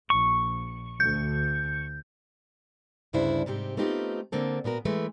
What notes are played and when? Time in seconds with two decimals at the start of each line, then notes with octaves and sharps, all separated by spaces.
0.10 A#1 C#6
1.00 D2 G6
3.13 D2 G2 C#3 D4 E4 C5
3.46 G#2 C3 C4 G4
3.77 A3 B3 C4 D#4 F4 G4
4.32 D3 A#3 C4 A4
4.64 A#2 B3 F#4 A#4
4.85 E3 G#3 A3 B4